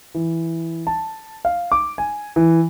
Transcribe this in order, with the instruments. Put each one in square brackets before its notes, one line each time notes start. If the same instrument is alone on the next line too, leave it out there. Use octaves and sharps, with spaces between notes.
[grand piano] E3
A5
F5
D6
G#5
E3